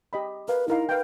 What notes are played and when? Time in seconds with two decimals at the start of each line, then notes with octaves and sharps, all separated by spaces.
0.13 G4 D#5 B5
0.48 A#4 B4 F5
0.68 D#4 E4 A#4 F5
0.89 B4 F5 G5